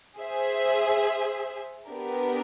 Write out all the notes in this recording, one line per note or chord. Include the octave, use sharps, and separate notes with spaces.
G#4 C5 E5
B3 D4 G4 A#4